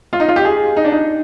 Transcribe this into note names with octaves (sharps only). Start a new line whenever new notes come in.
F4
D#4
F4
G4
G#4
D#4
D4
D#4